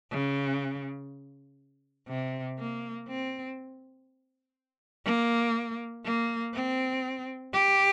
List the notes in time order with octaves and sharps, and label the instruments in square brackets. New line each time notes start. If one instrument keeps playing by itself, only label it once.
[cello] C#3
C3
A#3
C4
A#3
A#3
C4
G4